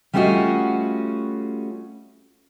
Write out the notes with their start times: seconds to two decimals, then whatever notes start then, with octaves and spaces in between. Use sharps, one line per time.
0.13 G3 A3 C#4 F4 F#4 D#5